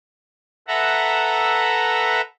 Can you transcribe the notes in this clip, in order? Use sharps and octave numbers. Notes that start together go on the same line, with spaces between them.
A4 B4 E5 F#5 A#5